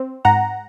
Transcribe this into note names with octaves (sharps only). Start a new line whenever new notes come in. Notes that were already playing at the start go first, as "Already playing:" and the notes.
Already playing: C4
G#2 F#5 A#5